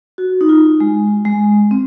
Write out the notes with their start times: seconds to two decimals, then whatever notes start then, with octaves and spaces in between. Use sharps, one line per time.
0.18 F#4
0.41 D#4
0.49 F4
0.80 G#3
1.25 G#3
1.71 C4